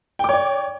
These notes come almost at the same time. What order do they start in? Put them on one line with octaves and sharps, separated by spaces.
G5 D6 C#5 D5